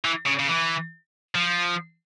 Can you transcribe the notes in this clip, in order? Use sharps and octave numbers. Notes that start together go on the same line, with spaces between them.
E3
C#3
C#3
E3
F3